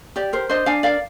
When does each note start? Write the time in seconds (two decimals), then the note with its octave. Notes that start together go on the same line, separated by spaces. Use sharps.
0.16 G4 D5
0.33 A#4 C5
0.50 D4 C5 D#5
0.66 D4 F5 G#5
0.83 A#4 D5 F5